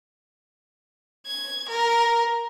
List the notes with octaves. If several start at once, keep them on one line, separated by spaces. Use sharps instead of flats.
G#6
A#4